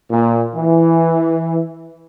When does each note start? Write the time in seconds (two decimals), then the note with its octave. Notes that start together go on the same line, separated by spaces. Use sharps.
0.11 A#2
0.55 E3